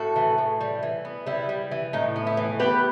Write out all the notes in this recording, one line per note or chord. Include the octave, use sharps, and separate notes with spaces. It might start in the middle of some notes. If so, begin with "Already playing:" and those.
Already playing: A2 F#4 A4
E3
A2
G3
E3
B3
G3 E4
G3
E3
A2 D#4
B3
E4
E3
B3 G4 B4